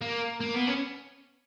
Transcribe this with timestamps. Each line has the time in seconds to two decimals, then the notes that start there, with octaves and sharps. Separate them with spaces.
0.01 A#3
0.40 A#3
0.54 B3
0.67 C#4